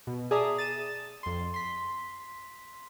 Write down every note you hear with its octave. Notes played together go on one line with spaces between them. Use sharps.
B2
G#4 D5 E5 A5 A#5 D#6
A6 D#7 E7
F2 C6
C6 B6